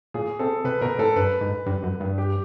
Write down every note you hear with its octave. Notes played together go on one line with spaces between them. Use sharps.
A#2 G#4
C3 A4
C3 B4
B2 A#4
A2 A4
G2 B4
G#2
G2
F#2
G2
G4